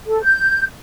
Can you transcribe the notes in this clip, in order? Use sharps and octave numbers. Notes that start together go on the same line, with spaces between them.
A4
G6